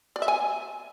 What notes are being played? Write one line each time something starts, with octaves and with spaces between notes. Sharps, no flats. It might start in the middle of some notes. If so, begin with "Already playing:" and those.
D5
E5
G#5